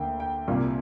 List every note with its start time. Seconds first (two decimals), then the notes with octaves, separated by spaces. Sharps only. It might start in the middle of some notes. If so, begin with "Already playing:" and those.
Already playing: D2 D3 A#3 G5
0.20 G5
0.48 C2 A#2 G3 D4 F4